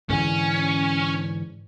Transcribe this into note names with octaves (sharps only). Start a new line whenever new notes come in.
G#2 D3 E3 C#4